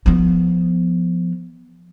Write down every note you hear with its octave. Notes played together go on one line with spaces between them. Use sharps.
F3 B3